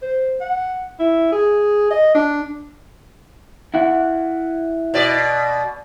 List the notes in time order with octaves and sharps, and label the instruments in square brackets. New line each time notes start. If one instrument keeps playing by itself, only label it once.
[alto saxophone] C5
F#5
E4
G#4
D#5
D4
[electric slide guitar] E4 F#5
[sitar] B2 D5